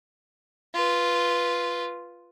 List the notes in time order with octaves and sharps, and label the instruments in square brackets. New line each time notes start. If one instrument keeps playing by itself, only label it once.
[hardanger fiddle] F4 B4